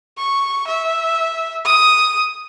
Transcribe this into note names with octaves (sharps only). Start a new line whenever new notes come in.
C#6
E5
D#6